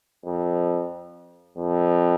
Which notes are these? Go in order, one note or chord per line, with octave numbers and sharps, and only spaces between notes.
F2
F2